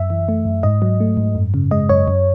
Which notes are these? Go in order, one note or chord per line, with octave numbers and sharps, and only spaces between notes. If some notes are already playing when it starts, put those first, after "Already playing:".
Already playing: F#2 E5
E3
A3
F#2
G#2 D#5
F#3
A3
G#2
F#2
C#3
G#3 D#5
F#2 C#5
F#2